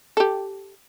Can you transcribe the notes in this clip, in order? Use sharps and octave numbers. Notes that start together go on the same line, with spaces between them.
G4 A4